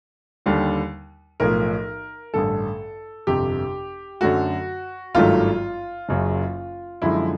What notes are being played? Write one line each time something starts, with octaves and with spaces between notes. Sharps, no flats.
D#2 D3 G3
B1 A2 F3 A#4
A1 G2 D3 A4
G1 F2 C3 G4
F#2 D3 F#3 A3 F#4
G#1 G2 D#3 F#3 A3 F4
F#1 F#2 C#3
F#2 D3 F3 G#3 E4